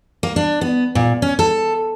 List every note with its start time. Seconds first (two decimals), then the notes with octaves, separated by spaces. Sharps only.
0.23 A#3
0.36 D4
0.61 B3
0.95 A#2
1.22 C#4
1.39 A4